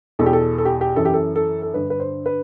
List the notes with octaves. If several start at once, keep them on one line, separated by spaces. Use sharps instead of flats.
E2 B2 A4
G4
A4
A4
G4
G4
F#2 E3 A4
G4
A4
A4
A4
G2 D3 B4
B4
C5
B4